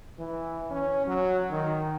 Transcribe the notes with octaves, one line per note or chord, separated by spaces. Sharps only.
E3
C#4
F#3
D#3